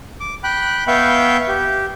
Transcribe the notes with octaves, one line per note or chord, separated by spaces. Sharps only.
D6
G5 B5 F#6
B3 E5 F5 G5 C#6 G6
G4